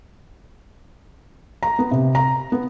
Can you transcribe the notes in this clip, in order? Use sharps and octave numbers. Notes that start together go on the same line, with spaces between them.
A#5
B3
C3
A#5
B3